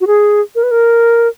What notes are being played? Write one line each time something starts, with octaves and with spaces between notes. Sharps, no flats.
F#4
G#4
A#4
B4
A#4